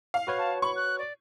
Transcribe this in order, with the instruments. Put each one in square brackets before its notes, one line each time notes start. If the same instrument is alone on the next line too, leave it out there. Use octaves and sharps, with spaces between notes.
[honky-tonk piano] F5
[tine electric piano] F#4 B4 C#5
[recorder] A5
[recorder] B5 [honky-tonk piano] C#6
[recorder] F#6
D5